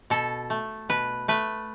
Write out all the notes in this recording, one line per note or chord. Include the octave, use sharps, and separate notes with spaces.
B2 A4
A3
B2 B4
A3 B4